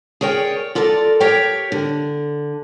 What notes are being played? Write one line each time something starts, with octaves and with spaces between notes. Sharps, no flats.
G#4 A#4 C#5 D5 G5
F4 A4 A#4 D5
G4 A#4 C#5 G5
D3